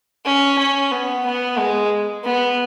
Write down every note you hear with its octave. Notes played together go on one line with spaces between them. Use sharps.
C#4
C#4
B3
B3
G#3
B3